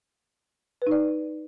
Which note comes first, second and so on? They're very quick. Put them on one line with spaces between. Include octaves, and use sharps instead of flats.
B4 D#4 D5